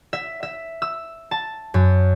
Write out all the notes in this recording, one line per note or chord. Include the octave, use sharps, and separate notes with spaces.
E5
E5
E6
A5
F#2